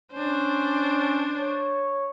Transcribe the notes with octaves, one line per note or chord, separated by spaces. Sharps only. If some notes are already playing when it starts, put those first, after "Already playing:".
C#4 D4 C5
C#5